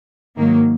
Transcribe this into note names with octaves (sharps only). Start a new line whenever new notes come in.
G#2 D#3 F#3 A#3